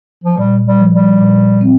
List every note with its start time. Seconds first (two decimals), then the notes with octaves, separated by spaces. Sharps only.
0.24 F3
0.38 A#2 G3
0.66 G3
0.79 F3
0.93 G3
1.20 A#2
1.61 C4